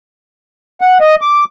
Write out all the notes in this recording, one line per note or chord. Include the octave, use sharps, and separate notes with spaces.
F#5
D#5
D6